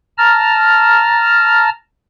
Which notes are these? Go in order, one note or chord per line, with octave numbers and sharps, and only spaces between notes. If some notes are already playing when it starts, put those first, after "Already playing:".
A5 A#5 F6